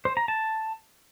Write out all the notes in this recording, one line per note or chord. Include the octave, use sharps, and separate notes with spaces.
C5
A#5
A5